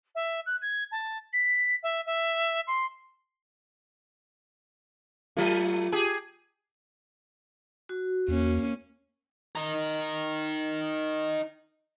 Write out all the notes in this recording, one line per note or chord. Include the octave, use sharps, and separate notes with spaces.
E5
F#6
G#6
A5
B6
E5
E5
C6
F#3 A3 F4
G4 G#4
F#4
E2 A#3 C#4
D#4 A#4